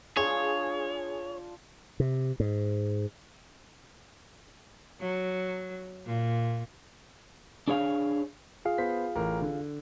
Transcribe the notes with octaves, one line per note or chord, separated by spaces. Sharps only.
D4 F4 G#4 C#5
C3
G#2
F#3
A#2
D4 G#4 C#5 F5
F4 G#4 F5
B3 C5 B6
A1 A#4
D3